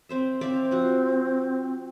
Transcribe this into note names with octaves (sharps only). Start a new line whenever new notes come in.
C4 C5 E5
C4 D5 E5 F5
F3 F#4